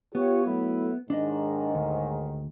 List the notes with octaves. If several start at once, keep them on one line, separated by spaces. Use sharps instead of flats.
B3 F4 G4 C#5
F#3 A3 E4
D#2 G#2 D#3 D4 D#5
D2